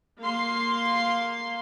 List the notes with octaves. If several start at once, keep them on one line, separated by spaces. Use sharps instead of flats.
A#3 F5 C6